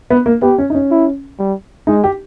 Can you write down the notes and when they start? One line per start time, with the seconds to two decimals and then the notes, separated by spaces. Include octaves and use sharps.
0.10 B3
0.26 A#3
0.42 B3 G4
0.58 C#4
0.70 D#4
0.75 C#4
0.91 E4
1.39 G3
1.87 G#3 D#4
2.04 G4